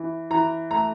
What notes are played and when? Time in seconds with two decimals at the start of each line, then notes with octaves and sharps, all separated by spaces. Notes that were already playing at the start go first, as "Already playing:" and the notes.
Already playing: E3
0.30 E3 A#5
0.71 A3 A#5